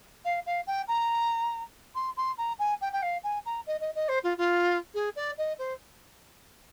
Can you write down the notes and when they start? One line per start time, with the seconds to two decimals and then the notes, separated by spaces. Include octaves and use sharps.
0.24 F5
0.45 F5
0.67 G5
0.87 A#5
1.95 C6
2.16 C6
2.37 A#5
2.59 G#5
2.81 G5
2.92 G5
3.02 F5
3.23 G#5
3.45 A#5
3.66 D#5
3.80 D#5
3.95 D#5
4.08 C5
4.23 F4
4.37 F4
4.94 G#4
5.16 D5
5.38 D#5
5.58 C5